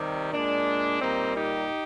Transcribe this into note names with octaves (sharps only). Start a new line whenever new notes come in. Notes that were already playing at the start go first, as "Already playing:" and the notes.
Already playing: C3 D#3 G3
A#2 G#3 D4
A#2 G3 A#3 C4 D#4
D#4 G4